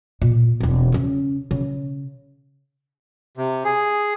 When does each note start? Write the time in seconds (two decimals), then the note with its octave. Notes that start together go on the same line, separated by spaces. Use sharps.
0.22 A#2
0.60 E1 C4
0.92 C#3 C#4
1.51 C#3
3.37 C3
3.65 G#4